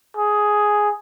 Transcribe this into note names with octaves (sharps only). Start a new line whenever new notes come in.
G#4